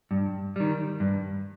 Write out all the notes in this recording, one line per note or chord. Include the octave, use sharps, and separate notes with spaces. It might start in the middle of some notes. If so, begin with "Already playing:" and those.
G2
D#3 G3
G2